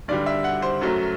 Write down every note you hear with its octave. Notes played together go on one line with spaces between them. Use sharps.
G2 D3 G3 D5
E5
F#5
C5
F#2 F#3 A3